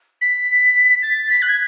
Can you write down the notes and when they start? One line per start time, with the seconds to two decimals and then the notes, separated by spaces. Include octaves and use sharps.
0.21 B6
1.02 A6
1.30 B6
1.42 F#6
1.48 G#6